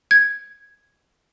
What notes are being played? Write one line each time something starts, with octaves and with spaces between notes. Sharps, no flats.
G#6